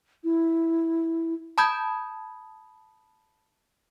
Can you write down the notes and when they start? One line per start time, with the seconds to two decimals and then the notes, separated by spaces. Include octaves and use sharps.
0.24 E4
1.58 A5 B5 D#6 G6 G#6